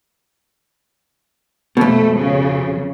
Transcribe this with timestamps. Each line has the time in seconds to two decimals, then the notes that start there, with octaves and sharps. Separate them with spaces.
1.77 F2 B2 A3
2.15 C#3